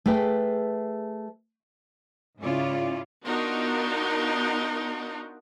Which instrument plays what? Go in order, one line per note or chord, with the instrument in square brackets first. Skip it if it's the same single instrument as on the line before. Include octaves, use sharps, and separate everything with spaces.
[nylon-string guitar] A3 G#4 B4 G5
[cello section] G#2 C#3 C#4 E4 F4 D5
[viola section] B3 D4 D#4 F4 F#4 A#4